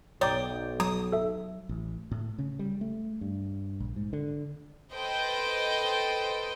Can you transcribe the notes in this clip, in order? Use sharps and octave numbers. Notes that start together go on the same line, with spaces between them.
B1 C#5 D5 G5 A#5 D6 D#6
F#3 A#5 D#6
A4 E5
A1
A2
C#3
G3
A3
G2
A#1
G#2
D3
A4 B4 C5 D#5 G5